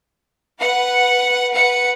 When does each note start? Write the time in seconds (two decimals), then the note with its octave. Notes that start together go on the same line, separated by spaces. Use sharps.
0.59 B4 F#5
1.51 B4 F#5 C#7